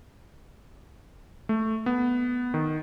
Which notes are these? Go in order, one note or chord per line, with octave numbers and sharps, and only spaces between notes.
A3
B3
D#3